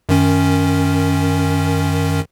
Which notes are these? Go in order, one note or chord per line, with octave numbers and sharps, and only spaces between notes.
F#2 D#3 C#4